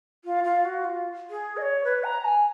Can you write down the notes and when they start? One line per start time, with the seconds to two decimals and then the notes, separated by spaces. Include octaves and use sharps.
0.25 F4
0.44 F4
0.65 F#4
0.84 F4
1.30 G#4
1.57 D#5
1.62 C#5
1.84 B4
2.04 A#5
2.25 G#5